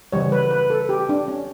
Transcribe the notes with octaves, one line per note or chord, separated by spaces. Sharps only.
C#3 E3 G3 C#5
B4
B4
A4
G4
D4
C#4